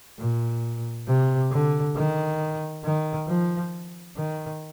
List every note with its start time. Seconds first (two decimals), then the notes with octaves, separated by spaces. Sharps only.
0.19 A#2
1.07 C3
1.51 D3
1.95 D#3
2.84 D#3
3.28 F3
4.16 D#3